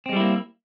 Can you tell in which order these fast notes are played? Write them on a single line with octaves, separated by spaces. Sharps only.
C4 G#3 G3 E4 A#3